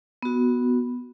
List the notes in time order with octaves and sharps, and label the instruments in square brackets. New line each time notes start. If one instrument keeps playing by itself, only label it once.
[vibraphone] B3 F#4